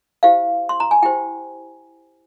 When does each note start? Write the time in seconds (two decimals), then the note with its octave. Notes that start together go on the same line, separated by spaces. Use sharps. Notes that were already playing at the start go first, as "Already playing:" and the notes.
0.23 E4 G4 C5 F5
0.69 C6
0.80 A#5
0.91 G#5
1.02 E4 G4 C5 G5